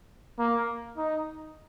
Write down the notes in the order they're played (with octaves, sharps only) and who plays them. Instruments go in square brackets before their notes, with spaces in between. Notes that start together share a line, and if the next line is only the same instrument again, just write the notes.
[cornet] A#3
D#4